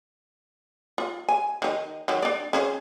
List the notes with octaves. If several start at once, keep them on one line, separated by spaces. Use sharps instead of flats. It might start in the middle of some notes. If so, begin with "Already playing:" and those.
F4
G#5
D#3 D#4
D#3 F#3
D4 D5
C#4 G#4 C5